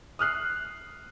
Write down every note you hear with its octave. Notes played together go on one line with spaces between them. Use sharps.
D#6 F6 F#6 C7